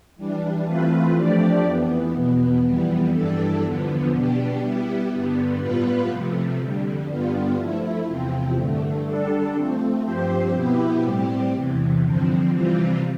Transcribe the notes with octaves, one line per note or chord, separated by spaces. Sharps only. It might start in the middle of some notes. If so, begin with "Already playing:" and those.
E3 G3 D4
E3 A3 C4 F4 B4
F3 A3 D4 G4 D5
F2 E3 B3
E2 B2 B3
F2 E3 G3 B3
G2 E3 G3 D4 A4
E2 D3 F3 B3
B2 B3 D4 G4
G3 B3 E4 G4
G2 D3 G3 B3
A2 G3 B3 F4 B4
C3 F3 A3
F2 D3 G3
G2 D3 G3 B3 F4
F3 A3 E4
E2 C3 F3 C4
G2 D3 A3
D3 G3 D4 A4
F3 A3 C4
G2 F3 C4 G4 C5
B2 B3 E4 G4
A2 G3 C4 G4
E2 C3 E3
G2 D3 F3 C4
C3 E3 G3 C4 F4